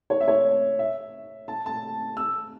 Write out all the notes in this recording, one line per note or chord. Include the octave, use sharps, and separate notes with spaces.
C#5
E5
C#5
E5
A5
A5
E6